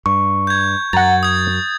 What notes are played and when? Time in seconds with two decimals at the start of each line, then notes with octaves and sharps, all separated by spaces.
0.06 G2 C#6
0.47 G6 G#6
0.93 F#2 F#5 A#5 A6
1.23 D#6 G#6